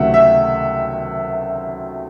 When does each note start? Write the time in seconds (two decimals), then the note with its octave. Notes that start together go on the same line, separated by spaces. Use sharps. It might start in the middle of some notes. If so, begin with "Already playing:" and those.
Already playing: C#2 C3 D#3 F#3 A3 E5 F#5
0.14 E5